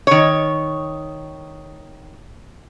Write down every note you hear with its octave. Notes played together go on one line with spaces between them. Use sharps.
D#3 C#5